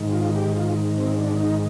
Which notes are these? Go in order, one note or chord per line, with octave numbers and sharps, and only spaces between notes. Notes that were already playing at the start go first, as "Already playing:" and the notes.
Already playing: G#2 D#3
F4
G4
F4
C4
D4
D#4